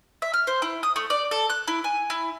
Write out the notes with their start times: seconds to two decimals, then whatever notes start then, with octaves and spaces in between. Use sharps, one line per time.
0.22 E5
0.34 F6
0.47 C5
0.62 E4
0.83 D#6
0.96 A3
1.10 D5
1.31 A4
1.50 F#6
1.68 E4
1.84 G#5
2.10 E4